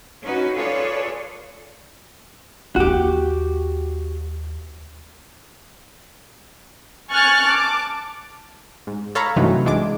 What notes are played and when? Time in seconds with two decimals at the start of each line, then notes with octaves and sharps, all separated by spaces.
0.23 C#4 D#4 F#4 B4
0.54 F4 G#4 A4 B4 C#5 D5
2.76 D#2 E3 F#4 G4
7.12 G#5 C#6 F6 F#6 A6
7.48 A5 D6
8.87 G#2
9.15 A4 C#5 F5 A#5 B5
9.36 G2 C3 E3 F#3 A3 D#4
9.65 B1 E3 G#3 D4 D6